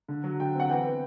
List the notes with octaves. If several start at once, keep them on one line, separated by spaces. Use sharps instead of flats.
D3
F#3
D3 G5
C4 F#5
E3 G5
B3